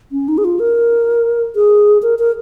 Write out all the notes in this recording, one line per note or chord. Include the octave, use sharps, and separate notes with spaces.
C#4
D#4
G#4
F4
A#4
G#4
A#4
A#4